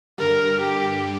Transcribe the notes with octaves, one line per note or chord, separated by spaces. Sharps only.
G2 D3 G3 A#4
G4